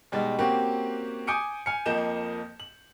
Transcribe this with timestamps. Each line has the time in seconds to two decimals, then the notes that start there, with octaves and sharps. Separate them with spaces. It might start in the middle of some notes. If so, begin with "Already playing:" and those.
0.12 B2 G3 G#3 D#4
0.39 A#3 C4 C#4 F#4 G4
1.27 G#5 D6 D#6 G6 C#7 D7
1.66 G#5 F6 C#7
1.86 F2 F3 A#3 D#5 G6 E7
2.60 F#7